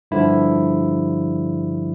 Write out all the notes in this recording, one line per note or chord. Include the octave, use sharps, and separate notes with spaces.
G2 D3 F3 E4